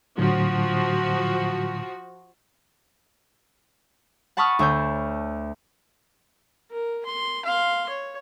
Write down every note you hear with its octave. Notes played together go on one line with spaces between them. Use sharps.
A2 D3 F3 F#3 F#4
F#5 A5 B5 C#6 D#6 F6
D2 C#5 E6 G6
A#4
C6
F5 C6
C#5